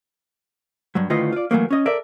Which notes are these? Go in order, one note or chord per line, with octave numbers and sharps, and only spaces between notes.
G2 F#3
D2 A2 D#3 F4 B4 D#5
F4 D5
E3 F#3 A3 A#3
C#4 D#5
A4 A#4 D5 E5